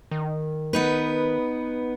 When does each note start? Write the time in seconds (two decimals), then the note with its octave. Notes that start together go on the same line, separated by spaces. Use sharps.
0.11 D#3
0.73 B3 D#4 B4